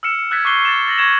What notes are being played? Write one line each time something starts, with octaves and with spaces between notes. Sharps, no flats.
E6 F6 C#7 E7
E6 F#6 G#6 A6 B6
C#6 D6 F#6 G6 C7 G7
A6 E7
E6 A6 A#6 F#7
C#6 G#6 E7